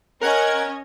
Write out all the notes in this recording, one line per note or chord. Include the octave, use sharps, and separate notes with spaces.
C#4 A#4 D#5 F#5 G#6